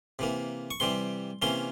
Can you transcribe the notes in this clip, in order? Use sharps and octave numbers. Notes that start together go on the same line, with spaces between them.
C3 E3 A#3
C#6
C3 E3 G3 C6
C3 E3 A#3 C#4 C6